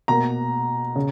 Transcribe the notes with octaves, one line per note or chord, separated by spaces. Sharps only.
B2 A#3 A#5
C#3